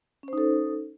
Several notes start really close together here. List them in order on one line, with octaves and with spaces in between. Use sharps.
C#4 C5 D#4 A4